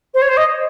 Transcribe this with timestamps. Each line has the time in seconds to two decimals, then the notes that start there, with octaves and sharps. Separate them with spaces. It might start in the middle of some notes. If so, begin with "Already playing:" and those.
0.14 C5
0.21 C#5
0.28 C5
0.37 D#5